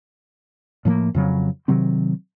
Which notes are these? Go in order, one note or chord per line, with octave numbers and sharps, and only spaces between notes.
A2 F3 A3 A#3
F2 C#3 F#3 C4
C3 D#3 F#3 C4